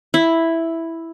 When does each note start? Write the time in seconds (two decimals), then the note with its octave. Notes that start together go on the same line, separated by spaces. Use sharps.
0.14 E4